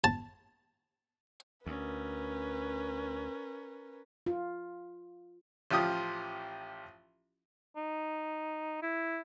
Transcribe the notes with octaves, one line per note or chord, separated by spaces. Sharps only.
A5
D2 C#4 A#4 B4
F4
A1 F3 F4 G4 D#6
D#4
E4